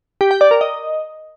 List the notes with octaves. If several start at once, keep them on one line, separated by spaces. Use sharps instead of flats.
G4
G5
D5
A#4
D#5